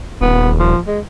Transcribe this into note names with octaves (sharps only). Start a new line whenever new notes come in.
D#1 B3
F3
G#3